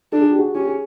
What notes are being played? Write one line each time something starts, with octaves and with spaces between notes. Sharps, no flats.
D4 A4
G#4
G4
F#4 G#4
C#4 G4
G#4